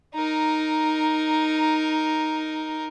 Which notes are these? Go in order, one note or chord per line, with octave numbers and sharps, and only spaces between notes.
D#4 A#4